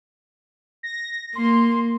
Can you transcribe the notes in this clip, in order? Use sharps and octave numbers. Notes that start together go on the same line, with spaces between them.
A#6
A#3 C6